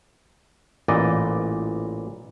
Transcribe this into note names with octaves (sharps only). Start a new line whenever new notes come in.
A1 A#2 E3 D5 D#5